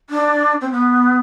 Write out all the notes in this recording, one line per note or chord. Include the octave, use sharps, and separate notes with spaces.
D4
C4
B3